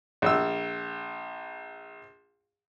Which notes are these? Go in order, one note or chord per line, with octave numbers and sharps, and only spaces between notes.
A#1 E6